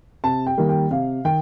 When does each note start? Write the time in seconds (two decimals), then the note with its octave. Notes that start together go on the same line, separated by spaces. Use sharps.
0.24 C3 A5
0.46 G5
0.58 D#3 G3 A#3
0.69 G5
0.91 C3 F5
1.25 D#3 G5